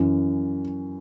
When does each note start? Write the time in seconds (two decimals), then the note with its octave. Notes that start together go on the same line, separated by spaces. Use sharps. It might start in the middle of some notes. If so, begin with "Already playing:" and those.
Already playing: F#2 E3